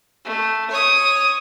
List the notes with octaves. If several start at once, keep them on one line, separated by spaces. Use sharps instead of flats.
A3
C#5 D#6